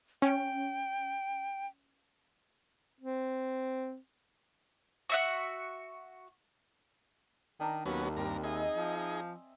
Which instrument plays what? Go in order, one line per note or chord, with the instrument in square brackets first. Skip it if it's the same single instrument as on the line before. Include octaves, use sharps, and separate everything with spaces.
[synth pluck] C#4 [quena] G5
[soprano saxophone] C4
[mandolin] F#4 E5 F#5
[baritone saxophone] D#3 [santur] D4 A#5
[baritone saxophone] D#2 [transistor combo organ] F#3 B3 C#4
[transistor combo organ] G2 A#4 [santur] C4
[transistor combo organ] D#4 G#4 [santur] D#5 E5 G#5
[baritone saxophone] F3